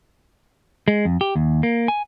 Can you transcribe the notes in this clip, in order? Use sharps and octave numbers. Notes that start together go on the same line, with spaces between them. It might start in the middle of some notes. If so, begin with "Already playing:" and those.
G#3
F2
G4
D#2
A#3
G#5